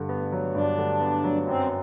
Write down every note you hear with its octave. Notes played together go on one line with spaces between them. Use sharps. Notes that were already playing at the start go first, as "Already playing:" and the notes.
Already playing: G2 D3
B3
F#3
G2 D4
D3
B3
F#3
F#2 C4